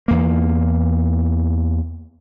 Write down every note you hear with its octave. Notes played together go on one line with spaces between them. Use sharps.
E2 A#3